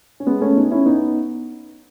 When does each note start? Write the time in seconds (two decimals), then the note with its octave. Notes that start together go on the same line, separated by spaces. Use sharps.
0.20 C#4
0.27 G#3 B3
0.41 A3 C#4
0.56 B3 D#4
0.71 C#4 E4
0.86 B3 D#4